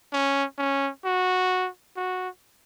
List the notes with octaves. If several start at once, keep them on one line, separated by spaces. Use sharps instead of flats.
C#4
C#4
F#4
F#4